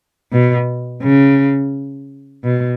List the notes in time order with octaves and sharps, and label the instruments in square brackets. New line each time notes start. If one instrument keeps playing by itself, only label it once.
[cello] B2
C#3
B2